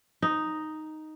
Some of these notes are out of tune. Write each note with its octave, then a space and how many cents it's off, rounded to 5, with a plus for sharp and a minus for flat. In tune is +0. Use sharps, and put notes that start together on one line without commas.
D#4 +0